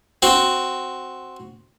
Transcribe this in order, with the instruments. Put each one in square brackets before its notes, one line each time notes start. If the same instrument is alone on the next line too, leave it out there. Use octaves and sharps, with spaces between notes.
[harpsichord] C4 F#4